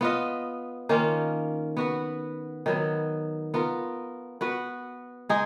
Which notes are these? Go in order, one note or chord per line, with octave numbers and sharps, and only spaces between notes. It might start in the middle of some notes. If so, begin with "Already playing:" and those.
B3 F4 B4 D#5
D#3 A#3 C#4 F4
B3 F#4 B4
D#3 F#3 B3
B3 F4 A#4
B3 F#4 B4
G#3 D#4 G#4